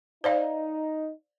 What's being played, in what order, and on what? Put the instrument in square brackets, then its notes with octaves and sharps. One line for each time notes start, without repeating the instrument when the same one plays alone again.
[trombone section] D#4 [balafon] C5 D5 F5